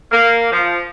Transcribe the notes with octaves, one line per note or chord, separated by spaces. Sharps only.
A#3
F3